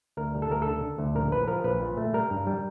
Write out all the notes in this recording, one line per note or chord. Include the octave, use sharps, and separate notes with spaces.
D2 A#4
G3
A4
D2 A#4
D3 A4
D3
D2
A#1 A#4
F3 B4
F3 A#4
A#1 B4
A#2
A3
G3 A#4
G2
G3